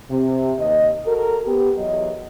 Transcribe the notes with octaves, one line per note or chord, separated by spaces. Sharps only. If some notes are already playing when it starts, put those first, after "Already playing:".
C3
D#2 D#5
F#4 A4 A#4
B3 G4
E2 F#3 D#5